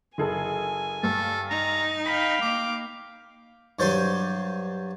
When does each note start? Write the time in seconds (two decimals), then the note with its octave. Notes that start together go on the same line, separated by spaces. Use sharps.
0.18 F#1 G#4 A4 G#5
1.03 G2 A4
1.50 D#4 A#5
2.06 F5 G5 B5 B6
2.42 A#3 D6
3.79 G2 F#3 C5 D5 G#5 C6